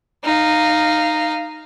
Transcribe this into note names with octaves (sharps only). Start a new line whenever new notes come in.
D#4 F5